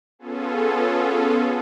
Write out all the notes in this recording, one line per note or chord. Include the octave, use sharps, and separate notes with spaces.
B3 C#4 F4 G#4 A4